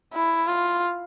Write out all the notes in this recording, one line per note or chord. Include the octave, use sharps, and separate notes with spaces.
E4
F4